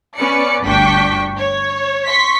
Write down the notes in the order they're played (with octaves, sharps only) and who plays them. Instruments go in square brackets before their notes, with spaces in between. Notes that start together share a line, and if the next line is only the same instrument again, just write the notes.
[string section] B3 C#4 B4 D5 C#7
G1 D2 D4 G5 C#6 B6
C#5
C6 C#6 B6